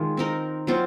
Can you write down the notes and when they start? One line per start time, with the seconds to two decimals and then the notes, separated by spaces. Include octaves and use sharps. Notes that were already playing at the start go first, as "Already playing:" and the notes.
Already playing: D#3 G#3 F4
0.17 C4 D#4 A#4
0.67 F#3 C4 F4